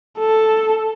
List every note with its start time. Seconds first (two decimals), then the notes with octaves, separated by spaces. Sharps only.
0.19 A4